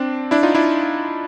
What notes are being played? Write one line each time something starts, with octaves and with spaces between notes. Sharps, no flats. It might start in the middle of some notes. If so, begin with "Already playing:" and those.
Already playing: C4 D4
D4 E4
D#4 F4
D4 E4